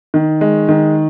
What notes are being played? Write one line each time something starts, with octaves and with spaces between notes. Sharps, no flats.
D#3
G#3
D#3